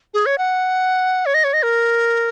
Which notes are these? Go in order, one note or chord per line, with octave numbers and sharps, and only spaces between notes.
G#4
C#5
F#5
C#5
D#5
C#5
D#5
A#4